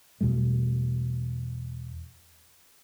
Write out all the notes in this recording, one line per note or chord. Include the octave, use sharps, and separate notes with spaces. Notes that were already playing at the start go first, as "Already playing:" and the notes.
E2 B2 G3 A3